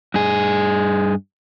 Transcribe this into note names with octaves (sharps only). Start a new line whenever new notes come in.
G2 G#4